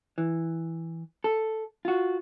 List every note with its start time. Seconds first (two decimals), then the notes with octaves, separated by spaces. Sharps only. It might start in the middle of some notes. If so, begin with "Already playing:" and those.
0.18 E3
1.24 A4
1.85 F4 F#4